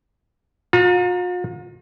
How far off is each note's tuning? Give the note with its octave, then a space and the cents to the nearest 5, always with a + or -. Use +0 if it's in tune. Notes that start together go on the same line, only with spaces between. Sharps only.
F4 +45 A#5 +0